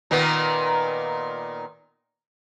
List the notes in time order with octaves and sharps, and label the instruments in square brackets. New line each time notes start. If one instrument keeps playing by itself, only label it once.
[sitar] A#2 D#3 B3